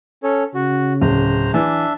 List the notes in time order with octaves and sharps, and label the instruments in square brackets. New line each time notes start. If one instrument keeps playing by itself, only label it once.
[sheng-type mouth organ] C#4 A4 C#5
[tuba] C#3 [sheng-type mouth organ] F#4
[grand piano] D1 [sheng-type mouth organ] C5 A#5
[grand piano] E3 [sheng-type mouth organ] D4 E5 A5